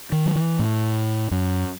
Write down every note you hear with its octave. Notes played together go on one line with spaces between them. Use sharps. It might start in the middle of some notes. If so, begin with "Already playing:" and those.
D#3
F#3
E3
A2
F#2